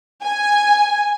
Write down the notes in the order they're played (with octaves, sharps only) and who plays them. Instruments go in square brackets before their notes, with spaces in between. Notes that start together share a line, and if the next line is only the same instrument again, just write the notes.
[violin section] G#5